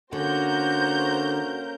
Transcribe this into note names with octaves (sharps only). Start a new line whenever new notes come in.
D3 A#3 C#4 F#4 A#4 C5 A#5 G6